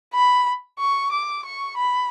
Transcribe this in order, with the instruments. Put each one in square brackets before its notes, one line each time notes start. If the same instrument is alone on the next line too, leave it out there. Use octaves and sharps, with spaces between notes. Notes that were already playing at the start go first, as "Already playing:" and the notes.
[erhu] B5
C#6
D6
C#6
B5